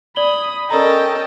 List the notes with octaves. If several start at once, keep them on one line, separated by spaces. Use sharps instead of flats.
D5 B5 D#6 F#7 G7
C#4 A4 A#4 D5 D#5 G5 A#5